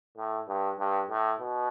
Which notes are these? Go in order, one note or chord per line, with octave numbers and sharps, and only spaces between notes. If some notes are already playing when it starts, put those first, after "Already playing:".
A2
G2
G2
A2
B2